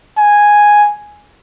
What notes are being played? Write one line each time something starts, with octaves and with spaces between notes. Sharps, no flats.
G#5